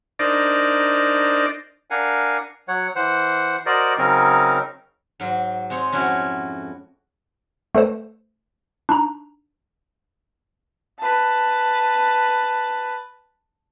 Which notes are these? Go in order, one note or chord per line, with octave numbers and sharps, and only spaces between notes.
D4 D#4 A#4 C5 D5
D4 A#4 F5 F#5 G#5
F#3 C#5 F#5
E3 C5 F#5
F#4 A#4 C5 D5 D#5
C#3 F#3 C4 C#4 D#4 A#4
G#2 F#3
G#3 C4 C#5
F2 C#4 E4 F#4
A3 A4 B4 C5
D4 D#4 A#5
B4 A5